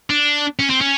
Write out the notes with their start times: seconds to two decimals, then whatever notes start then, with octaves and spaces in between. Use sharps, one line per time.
0.10 D4
0.59 C#4
0.70 C4
0.81 C#4